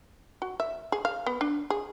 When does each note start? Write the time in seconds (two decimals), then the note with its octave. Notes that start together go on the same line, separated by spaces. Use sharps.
0.42 F#4
0.60 E5
0.92 G#4
1.05 F5
1.26 B3
1.41 D4
1.70 G#4